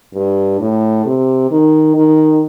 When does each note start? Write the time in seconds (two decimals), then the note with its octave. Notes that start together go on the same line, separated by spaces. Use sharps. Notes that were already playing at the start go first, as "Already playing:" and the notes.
0.15 G2
0.60 A2
1.06 C3
1.51 D#3
1.95 D#3